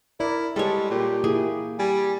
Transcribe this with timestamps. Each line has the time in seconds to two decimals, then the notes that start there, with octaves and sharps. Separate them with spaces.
0.20 E4 A#4 D5
0.56 G3 G#3 A4 C#5
0.90 A#2 G4
1.24 A#3 E4 G#4
1.79 G3 G#5